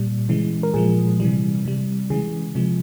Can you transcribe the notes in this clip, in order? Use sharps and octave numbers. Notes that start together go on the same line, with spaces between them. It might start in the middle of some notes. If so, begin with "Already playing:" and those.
Already playing: A#2 G3
C#3 E3 G#3
A#4
A#2 F3 G#3 G#4
C3 E3 G3
C3 G3
C#3 E3 G#3 G#4
C3 F3 G#3